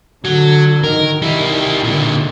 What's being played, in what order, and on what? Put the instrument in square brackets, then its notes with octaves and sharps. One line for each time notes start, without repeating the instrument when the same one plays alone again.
[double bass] D3 [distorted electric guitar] F#3
[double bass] D#3 [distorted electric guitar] A#4
[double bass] D#3 [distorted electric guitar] G3 E4
[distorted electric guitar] A#2 D3